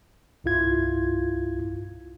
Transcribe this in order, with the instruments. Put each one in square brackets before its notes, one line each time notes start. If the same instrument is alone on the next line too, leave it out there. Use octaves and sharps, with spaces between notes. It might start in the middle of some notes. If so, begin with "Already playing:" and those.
[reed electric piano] C2 G2 E4 F4 G#6